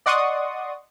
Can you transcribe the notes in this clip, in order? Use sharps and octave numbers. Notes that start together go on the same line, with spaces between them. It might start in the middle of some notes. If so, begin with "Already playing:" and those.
D5 D#5 F#5 C6 C#6 D#6